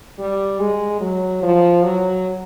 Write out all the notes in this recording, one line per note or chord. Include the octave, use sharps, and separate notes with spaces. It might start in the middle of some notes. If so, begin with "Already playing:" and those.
G3
G#3
F#3
F3
F#3